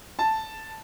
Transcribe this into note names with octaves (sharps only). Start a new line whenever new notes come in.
A5